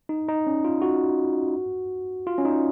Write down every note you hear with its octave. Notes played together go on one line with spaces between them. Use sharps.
D#4
D#4
C#4
F4
F#4
F4
C#4
D#4